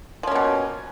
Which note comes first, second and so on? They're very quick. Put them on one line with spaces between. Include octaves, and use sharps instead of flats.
F3 C#4 A#3 B2